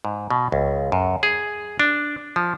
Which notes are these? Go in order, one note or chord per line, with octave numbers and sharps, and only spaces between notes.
G#2
B2
C#2
F#2
G#4
D4
F3